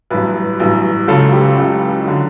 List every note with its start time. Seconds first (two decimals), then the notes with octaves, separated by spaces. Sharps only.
0.10 A1 G2 F#3 B4
0.60 A1 G2 F#3
1.08 C#2 C#3 F#3 A4
1.32 G4
1.57 C#2 C#3 F#3
2.05 D3 F#3